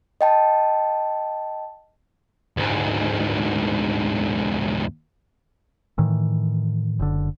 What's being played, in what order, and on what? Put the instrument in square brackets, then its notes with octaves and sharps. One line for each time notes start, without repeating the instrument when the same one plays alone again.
[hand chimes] D#5 G5 A5
[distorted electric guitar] D2 G#2
[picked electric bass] A2 D#3 E3
F#1 D3